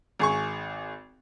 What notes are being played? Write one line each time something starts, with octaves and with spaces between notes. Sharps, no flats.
G#1 G#4 C#6